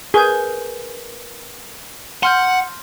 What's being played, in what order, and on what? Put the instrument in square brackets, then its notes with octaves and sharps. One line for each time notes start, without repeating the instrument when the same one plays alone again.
[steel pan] G#4 [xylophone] A#4 B4 G6
[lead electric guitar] F#5 [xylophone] C6 F6 G6